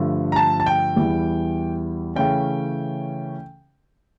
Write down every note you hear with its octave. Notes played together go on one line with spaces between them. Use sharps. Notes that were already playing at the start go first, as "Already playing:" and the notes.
Already playing: G2 D3 F3 A3
A#5
A5
A5
G5
E2 E3 G3
C#3 E3 A3 C#4 G5